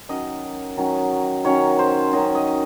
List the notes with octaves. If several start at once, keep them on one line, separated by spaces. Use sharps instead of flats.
D#3 F#3 C#4 D#5
D#3 F#3 C#4
D#3 F#3 C#4 C#5
C5
D#3 F#3 C#4 D#5
D#5